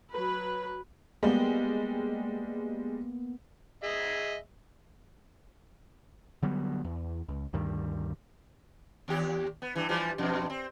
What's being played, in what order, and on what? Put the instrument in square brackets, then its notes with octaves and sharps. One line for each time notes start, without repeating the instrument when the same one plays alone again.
[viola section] F#3 B4
[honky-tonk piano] G3 G#3 [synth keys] A#3 B3
[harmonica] G#4 D#5 E5
[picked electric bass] D3 F#3 G3 B3
E2
C#2
D2 G2 D#3 G3
[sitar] D#2 G4
B3
G2 E3
E3 F3 G3
E2 G2 B2
C4